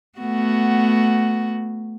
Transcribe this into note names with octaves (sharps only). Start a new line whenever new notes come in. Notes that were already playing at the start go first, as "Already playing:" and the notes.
A3 B3 F#4